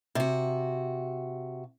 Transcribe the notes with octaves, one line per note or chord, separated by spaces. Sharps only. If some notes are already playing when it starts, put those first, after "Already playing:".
C3 F#4